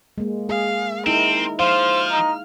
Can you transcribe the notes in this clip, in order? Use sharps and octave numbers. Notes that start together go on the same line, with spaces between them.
G#3 A#3
G#4 F5
C4 D#4 E4 A#4
F3 C5 F5 F6
D#4